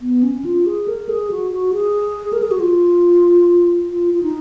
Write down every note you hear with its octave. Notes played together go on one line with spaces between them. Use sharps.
B3
C#4
F4
G#4
A#4
G#4
F#4
F#4
G#4
A#4
G#4
F#4
F4
F4
F4
D#4